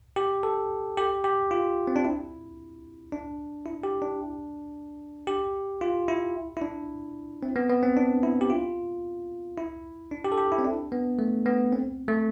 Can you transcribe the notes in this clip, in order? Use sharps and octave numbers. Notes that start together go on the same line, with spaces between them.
G4
A4
G4
G4
F4
C4
D4
E4
D4
E4
G4
D4
G4
F4
E4
E4
D4
C4
B3
B3
C4
D4
E4
G4
F4
E4
D4
G4
A4
G4
E4
C4
D4
B3
A3
B3
C4
A3